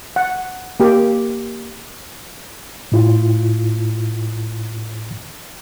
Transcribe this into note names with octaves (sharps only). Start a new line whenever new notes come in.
F#5
A#3 G4
A2 E4 F4